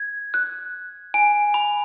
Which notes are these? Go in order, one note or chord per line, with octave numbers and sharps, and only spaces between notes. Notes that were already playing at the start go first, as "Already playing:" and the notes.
Already playing: G#6
F#6
G#5
B5